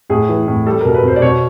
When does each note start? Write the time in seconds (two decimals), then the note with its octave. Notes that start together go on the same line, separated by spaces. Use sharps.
0.10 A2 G#4
0.29 E3
0.48 A2
0.66 G3 A4
0.80 B2 A#4
0.94 B4
1.03 B2 C5
1.16 D5
1.22 B2 C#5